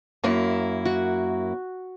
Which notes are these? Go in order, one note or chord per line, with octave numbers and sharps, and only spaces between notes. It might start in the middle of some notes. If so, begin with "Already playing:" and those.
F#2 A#3 E4
F#4